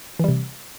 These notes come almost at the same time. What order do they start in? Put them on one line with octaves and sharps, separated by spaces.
E3 G3 C3